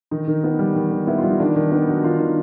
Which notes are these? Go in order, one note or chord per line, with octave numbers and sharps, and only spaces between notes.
D#3 D#4
D#3
B3
G3
D#3
D#3
B3 E4
F4
G3
D#4
D#3 D4
D#3
B3 D4
F#3 D#4
D#3 F4
D#3